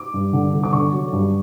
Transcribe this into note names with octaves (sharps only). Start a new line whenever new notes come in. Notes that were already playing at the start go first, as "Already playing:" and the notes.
Already playing: D6
G2
D3
G1
D6
D3 C#6
F#3
G2